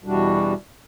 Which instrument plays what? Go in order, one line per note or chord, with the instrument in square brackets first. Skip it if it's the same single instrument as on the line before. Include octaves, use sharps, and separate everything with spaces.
[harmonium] E2 B2 G3 D4 F#4